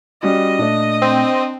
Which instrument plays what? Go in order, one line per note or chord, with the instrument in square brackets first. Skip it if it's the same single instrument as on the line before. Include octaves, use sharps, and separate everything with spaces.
[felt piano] G3 C#4 F#4 [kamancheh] D#5
[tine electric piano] A#2 A3 [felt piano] D4 D5
[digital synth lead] C4